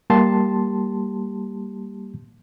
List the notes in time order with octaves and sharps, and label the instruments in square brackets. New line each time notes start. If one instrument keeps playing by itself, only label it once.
[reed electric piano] G3 A#3 G4 A5 C6